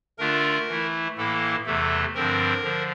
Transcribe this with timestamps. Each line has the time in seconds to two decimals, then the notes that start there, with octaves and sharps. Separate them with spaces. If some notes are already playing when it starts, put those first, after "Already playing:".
0.18 D3 A3 D4 F4 A#4
0.68 E3 A3 E4
1.17 A2 E3 A#3 E4 A4
1.66 E2 C3 E3 A3 A4
2.15 G2 D3 F3 C4 A#4
2.64 D3 F3